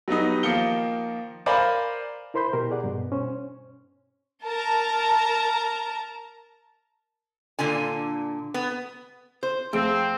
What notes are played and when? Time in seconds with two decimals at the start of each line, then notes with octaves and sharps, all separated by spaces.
0.08 F#3 G3 B3 D#4
0.43 D#3 F3 A#3 C#7 G7
1.46 A#4 C5 D5 F5 G#5 B5
2.34 E4 A#4 C5 B5 C6 G6
2.53 B2 G4 A#4
2.71 G#4 D5 F#5
2.84 G2 B2
3.12 C#4 C5
4.44 A#4 A5 A#5
7.59 A#2 D3 F4 G#5
8.54 B3
9.43 C5
9.73 F2 A3 C4 G#4 D7